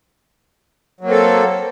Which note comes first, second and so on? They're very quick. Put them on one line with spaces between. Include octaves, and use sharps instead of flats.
F#3 A#3 C4 A4